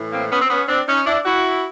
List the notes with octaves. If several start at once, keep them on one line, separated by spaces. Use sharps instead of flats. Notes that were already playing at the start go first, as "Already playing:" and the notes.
Already playing: A2 E3
A#3 C4
B3 C#4
C4
B3 C#4
C4 D4
C#4 D#4
D4 E4
E4 F#4